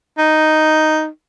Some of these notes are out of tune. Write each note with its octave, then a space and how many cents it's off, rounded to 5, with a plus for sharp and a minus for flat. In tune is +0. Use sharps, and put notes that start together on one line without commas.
D#4 +0